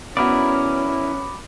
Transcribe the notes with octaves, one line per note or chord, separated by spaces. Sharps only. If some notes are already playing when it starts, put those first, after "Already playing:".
B3 C#4 E4 F#4 A#4 D5 B5 D6